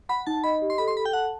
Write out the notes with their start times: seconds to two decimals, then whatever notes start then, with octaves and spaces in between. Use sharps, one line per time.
0.09 F#5 B5
0.27 D#4 A5
0.44 D#5 B5
0.62 G4
0.70 C6
0.78 A4 B5
0.88 C6
0.96 A4 B5
1.06 G5
1.13 F#5 A5